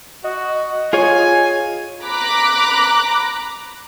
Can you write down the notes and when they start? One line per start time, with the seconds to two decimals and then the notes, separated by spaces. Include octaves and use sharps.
0.24 F#4 D#5
0.93 F4 G#4 C#5 G#5
2.04 A#5 B5 D6 F#6